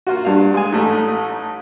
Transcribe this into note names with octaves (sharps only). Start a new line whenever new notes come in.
A#3 F4 F#4
G2 G3 F5
G#3 G#5
A1 A3 D#4